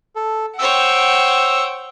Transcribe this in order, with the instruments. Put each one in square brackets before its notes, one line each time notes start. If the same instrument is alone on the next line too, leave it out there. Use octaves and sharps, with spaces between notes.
[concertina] A4
[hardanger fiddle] C5 C#5 [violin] F#5 G5 [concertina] E6